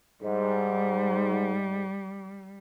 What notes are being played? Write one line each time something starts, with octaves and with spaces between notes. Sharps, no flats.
G#2 G3